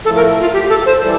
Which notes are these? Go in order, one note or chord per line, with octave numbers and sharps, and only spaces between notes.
A2 F3 A3 A4
A#4
F4
G4
A4
C5
E3 G3 A4